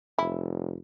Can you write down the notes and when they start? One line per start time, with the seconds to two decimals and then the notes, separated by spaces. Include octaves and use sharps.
0.19 F1 E4